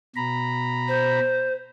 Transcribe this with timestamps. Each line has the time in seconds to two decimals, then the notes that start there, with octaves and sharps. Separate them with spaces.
0.16 B2 A#5 B5
0.87 C5